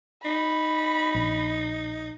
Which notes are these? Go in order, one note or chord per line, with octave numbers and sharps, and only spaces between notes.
D#4 B5
A#1